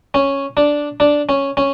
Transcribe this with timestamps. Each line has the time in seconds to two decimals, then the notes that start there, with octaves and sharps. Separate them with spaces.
0.14 C#4
0.57 D4
1.00 D4
1.29 C#4
1.57 C#4